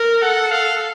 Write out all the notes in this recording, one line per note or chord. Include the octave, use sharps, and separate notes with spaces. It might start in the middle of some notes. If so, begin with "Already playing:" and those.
Already playing: A#4
A4 F#5
F5